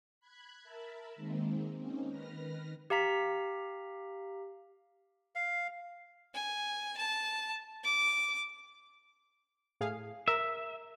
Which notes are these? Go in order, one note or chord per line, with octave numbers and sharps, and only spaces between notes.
B5 F#6 G#6
A#4 E5 A5 B5
D#3 G#3 A#3 C4
A#3 C4 C#4 D#4
D#3 B4 F6 A#6
G4 F5 A#5 B6
F5
G#5
A5
D6
A2 G#4 F5
A#4 E5